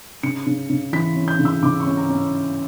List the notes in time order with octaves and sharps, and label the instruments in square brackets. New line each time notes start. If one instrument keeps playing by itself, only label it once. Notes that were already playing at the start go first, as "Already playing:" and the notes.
[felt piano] C#3 C#7
C#3
C#3
E3 B6
C#4
G6
C#3
E6
C#3 D6
C#6
C#4
A#5
C#4